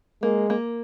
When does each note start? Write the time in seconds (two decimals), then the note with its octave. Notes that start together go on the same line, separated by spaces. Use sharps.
0.22 G#3 A#3
0.50 A#3